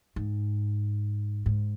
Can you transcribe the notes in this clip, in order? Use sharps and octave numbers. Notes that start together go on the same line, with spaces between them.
G#2
G#2